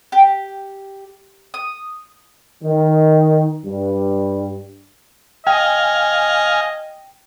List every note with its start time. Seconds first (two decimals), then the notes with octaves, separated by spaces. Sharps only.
0.12 G4
1.54 D#6
2.64 D#3
3.66 G2
5.47 D#5 F5 G5 G#5